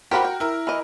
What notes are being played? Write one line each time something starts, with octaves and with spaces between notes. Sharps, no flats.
F#4 G4 A#4 C5 B5
G5
E4 A#4
E3 D#5